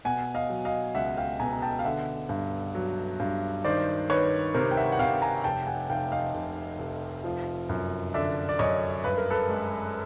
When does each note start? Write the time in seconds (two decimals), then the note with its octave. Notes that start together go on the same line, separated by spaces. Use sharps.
0.05 B2 F#5 G#5
0.35 D#5 F5
0.50 F#3
0.65 D#5 F5
0.95 C#2 E5 F#5
1.17 F5 G5
1.40 B2 G#5 A#5
1.53 A#5
1.62 G5 A5
1.79 F5
1.85 D3 E5 F#5
2.29 G2
2.75 F#3
3.20 G2
3.64 D#3 C5 D5
4.09 D#3 B4 C#5
4.54 C3 A#4 C5
4.71 G5
4.77 E5 F#5
4.92 F#5
4.99 C3 F5 G5
5.22 G#5 A#5
5.44 F1 G5 A5
5.67 F#5 G#5
5.90 F1 F5 G5
6.12 D#5 F5
6.34 F1
6.79 F1
7.24 F3
7.69 F#2
8.14 D3 D5 E5
8.49 D5
8.59 F#2 C#5 D#5
9.04 G2 B4
9.17 A#4
9.30 A4 B4
9.49 G#3